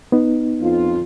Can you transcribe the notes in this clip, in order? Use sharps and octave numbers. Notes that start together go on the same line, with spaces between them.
B3 D#4
F2 F4